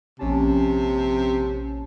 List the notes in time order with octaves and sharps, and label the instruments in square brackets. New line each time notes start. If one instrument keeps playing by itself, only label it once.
[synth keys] A#1 C#4 A5 [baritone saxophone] C3